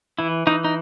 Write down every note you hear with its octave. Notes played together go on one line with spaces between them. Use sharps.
E3 E4
E3 D#4
D#4